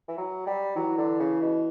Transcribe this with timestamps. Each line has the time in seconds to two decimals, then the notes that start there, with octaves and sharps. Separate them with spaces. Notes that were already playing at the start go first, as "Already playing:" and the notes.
0.08 E3
0.17 F#3
0.47 G3
0.76 E3 F#3
0.98 D3
1.19 C#3
1.42 B2